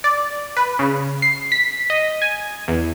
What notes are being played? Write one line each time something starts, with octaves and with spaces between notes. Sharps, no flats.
D5
B4
C#3
C7
B6
D#5
G#5
E2